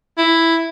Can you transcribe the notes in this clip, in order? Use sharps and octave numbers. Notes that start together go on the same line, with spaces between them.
E4